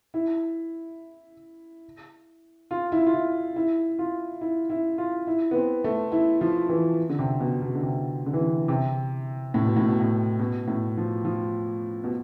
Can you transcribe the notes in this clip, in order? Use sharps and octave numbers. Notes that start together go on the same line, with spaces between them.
E4
F4
E4
F4
E4
E4
F4
E4
E4
F4
E4
B3
C4
A3
E4
F3
E3
D3
C3
B2
B2
D3
C3
D3
E3
D3
C3
A2
B2
A2
B2
A2
B2
A2
F3
F3
B2